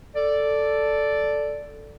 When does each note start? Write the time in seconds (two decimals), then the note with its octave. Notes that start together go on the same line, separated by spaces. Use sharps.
0.16 A4 D5